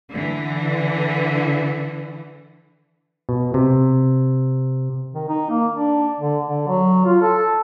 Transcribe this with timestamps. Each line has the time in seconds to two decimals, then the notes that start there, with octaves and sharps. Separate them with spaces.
0.12 D3 E3
3.29 B2
3.54 C3
5.14 D#3
5.29 D#4
5.50 A#3
5.73 D4
6.20 D3
6.47 D3
6.68 F#3
7.06 F4
7.22 A4